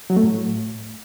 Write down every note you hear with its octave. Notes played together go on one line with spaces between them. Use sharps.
F#3
A3
A2